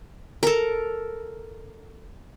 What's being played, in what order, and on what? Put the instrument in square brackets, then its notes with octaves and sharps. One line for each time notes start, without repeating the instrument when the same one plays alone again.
[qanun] A4 A#4